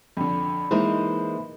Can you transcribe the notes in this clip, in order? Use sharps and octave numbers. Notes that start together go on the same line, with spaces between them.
F2 D3 B5
E3 G#3 A#3 D#4 E4 A#4 C5